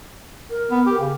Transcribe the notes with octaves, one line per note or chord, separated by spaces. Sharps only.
A#4
B3
G4
C#3